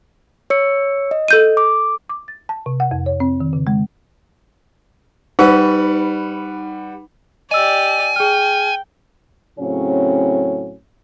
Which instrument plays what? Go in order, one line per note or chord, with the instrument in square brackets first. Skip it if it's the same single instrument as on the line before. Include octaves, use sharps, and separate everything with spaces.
[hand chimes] C#5 E6 C#7
D#5
[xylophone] A4 G6 D#7
[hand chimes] D6
[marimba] D6
A6
A5
C3
F#5
F2
C#5
C4
D#3
C#3
G#3
[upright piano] G3 B4 F#5 [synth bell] D#4
[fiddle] G4 D5 [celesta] D#5 E6 [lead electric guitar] G#5
[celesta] G#4 F6 [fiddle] G5
[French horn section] A2 C#3 F#3 C4 C#4